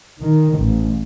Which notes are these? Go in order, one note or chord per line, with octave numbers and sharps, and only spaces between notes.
D#3
A1